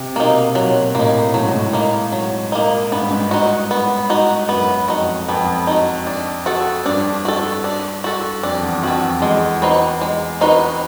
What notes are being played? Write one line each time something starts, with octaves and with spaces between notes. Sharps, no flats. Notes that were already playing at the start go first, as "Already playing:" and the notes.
Already playing: C3
B2 A#3 D#4
A#2 F#3
A2 A#3 D#4
A2 F#3
G#2
A2
A#3 D#4
F#3
A#3 D#4
G#2 B3
G2
G#2
D#4 F#4
B3
D#4 F#4
F#2 B3
F2 D#4 F#4
F2 B3
D#4 F#4
D4
F#4 A4
G2 D4
F#4 A4
D4
F#4 A4
F2 D4
E2
F2 F#4 A4
F2
E2 G#3
C4 D#4 F#4 B4
G#3
C4 D#4 F#4 B4